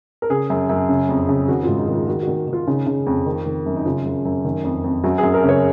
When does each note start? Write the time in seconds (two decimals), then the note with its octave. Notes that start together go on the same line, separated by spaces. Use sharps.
0.22 A#4
0.30 C#3 G#4
0.50 F#2
0.69 F#2
0.89 C#3
1.09 F2
1.29 C#3
1.48 D#3 F#4
1.63 G#2 F4
1.79 D#4
1.88 D#3
1.94 F4
2.07 D#3 F#4
2.22 D#3 F#4
2.47 D#3
2.53 F4
2.67 C#3 D#4
2.87 C#3
3.06 F2
3.26 D#3
3.46 D#3
3.66 F#2
3.76 D#4
3.85 C#3 F4
4.06 F#2
4.25 F#2
4.45 D#3
4.64 F2
4.84 F2
5.04 F#2 F#4
5.18 F#2 G#4
5.34 A#4
5.44 C#3
5.49 C#5